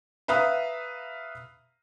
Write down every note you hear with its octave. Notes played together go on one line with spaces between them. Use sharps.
B4 E5 F5 A#5 D#6